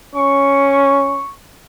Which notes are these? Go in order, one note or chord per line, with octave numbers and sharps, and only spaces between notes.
C#4 C#6